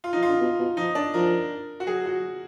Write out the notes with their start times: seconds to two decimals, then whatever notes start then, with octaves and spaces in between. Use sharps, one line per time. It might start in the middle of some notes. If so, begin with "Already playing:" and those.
0.04 F4
0.13 F3 D#4
0.23 F4
0.28 D3
0.41 B2
0.59 B2
0.77 F3 D#4
0.95 D4
1.14 F3 A#4
1.80 F#4
1.87 F#3 G#4
2.06 F#4